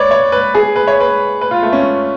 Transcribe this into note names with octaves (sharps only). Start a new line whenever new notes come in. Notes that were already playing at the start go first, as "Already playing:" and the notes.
Already playing: B4 C#5 D5
C#5
B4
G#4
B4
C#5
B4
B4
F4
A3
C#4